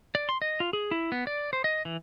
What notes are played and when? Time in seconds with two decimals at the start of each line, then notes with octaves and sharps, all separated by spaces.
0.15 D5
0.29 C6
0.42 D#5
0.60 F4
0.73 G#4
0.91 E4
1.12 B3
1.27 D5
1.53 C5
1.64 D#5
1.85 E3